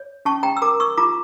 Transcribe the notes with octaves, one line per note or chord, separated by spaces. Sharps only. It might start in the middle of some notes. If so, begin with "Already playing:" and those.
Already playing: C#5
C#4 A5 C#6
G5 A#5
E6
A#4 A#5 D6
C#6 E6
F4 A#5 D6